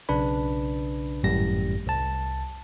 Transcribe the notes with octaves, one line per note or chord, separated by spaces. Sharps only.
B1 C#3 D4 B4 B5
G#1 F#2 A2 G3 G4 A#6
C2 A5